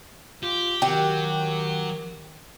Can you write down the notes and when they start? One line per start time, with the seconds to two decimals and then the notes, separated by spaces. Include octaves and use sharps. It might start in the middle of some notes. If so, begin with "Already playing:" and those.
0.43 F4 G4
0.82 D#3 F#3 G4